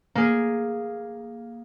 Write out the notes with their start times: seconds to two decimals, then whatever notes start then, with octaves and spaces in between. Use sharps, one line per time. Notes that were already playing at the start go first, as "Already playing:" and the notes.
0.15 A#3 G#4